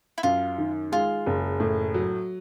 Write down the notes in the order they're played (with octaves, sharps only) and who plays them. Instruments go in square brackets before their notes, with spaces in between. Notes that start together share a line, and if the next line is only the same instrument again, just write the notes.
[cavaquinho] E4
[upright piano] F#2 [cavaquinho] F4
[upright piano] D#3
[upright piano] G#3 [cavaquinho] F4
[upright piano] F#1
A2
F#3